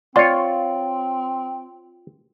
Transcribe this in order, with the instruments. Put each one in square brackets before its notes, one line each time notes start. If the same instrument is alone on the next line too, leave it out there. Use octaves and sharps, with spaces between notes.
[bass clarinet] C4 [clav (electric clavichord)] F4 C#5 [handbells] D5 C6